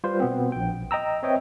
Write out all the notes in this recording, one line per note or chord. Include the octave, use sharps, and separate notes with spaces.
G3 F4 B4 C5
B2 B3 C4
A#1 G5
D#5 G5 A#5 E6
C4 B4 C#5 D#5 E5 G5